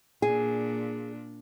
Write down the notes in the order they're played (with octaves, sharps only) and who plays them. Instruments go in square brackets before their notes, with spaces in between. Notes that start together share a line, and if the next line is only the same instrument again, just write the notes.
[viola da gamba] A#2 D4 [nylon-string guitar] G#4